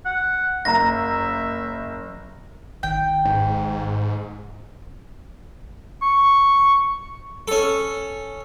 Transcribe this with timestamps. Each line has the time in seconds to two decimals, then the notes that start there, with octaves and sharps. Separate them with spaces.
0.06 F#5
0.65 F#1 E5 F5 A#5 A#6
2.83 G#1 D#3 G5
3.25 G#2
6.02 C#6
7.48 C#4 A4